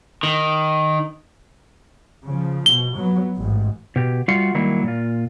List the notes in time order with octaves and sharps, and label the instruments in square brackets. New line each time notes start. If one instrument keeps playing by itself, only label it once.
[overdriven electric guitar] D#3
[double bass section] C#3 F3
[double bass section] B2 [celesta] G7
[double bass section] F#3 B3
A1 G#2
[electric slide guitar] B2 G4
G3 A3 F4 F#4 F5 F#5
D#3 F#3 G3 A#3 E4
A#2 F4